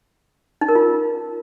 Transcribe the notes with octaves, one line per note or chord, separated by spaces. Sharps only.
D#4
A#4
F4